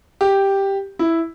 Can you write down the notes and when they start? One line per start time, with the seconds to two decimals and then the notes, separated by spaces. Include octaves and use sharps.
0.21 G4
0.99 E4